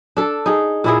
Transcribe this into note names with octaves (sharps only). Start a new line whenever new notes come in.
D4 A4
D#4 G#4
A#2 E4 G#4